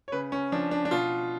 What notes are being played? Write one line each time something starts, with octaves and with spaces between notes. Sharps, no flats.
C#5
C#3 B4
C#4
F3 D4
D4
D4
B2 F4